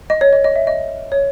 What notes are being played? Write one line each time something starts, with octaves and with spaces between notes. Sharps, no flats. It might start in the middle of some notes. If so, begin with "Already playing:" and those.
D#5
C#5
D#5
D#5
E5
D#5
C#5